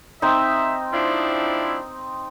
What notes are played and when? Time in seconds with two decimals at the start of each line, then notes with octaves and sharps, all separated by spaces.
0.22 C4 D#4 E5
0.93 F3 D4 E4